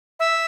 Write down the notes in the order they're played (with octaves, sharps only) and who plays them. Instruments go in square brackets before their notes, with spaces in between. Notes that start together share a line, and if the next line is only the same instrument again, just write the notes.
[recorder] E5